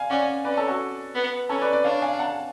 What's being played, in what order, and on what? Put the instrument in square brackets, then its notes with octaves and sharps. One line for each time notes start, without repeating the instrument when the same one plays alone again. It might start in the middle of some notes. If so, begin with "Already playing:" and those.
Already playing: [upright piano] F5 G#5
[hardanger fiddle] C#4 [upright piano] D5 F#5
[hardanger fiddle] C#4 [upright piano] B4 D5
[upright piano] A4 C#5
F#4 A4
[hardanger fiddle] B3
[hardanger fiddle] C#4 [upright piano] A4 C#5
[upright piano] B4 D5
B4 D5
[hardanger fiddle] D4 [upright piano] C#5 F5
[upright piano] F5 G#5
F#5 A5